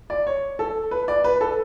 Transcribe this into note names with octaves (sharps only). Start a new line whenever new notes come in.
D5
C#5
A4
B4
D5
B4
A4